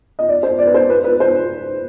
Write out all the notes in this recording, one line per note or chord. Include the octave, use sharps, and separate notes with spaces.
D#5
D5
C5
D5
B4
C5
B4
B4
C5